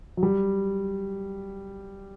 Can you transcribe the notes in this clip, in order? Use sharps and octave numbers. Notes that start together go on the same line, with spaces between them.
F#3
G3